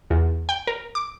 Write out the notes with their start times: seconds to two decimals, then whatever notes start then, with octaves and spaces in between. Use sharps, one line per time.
0.10 E2
0.49 G5
0.67 A#4
0.95 D6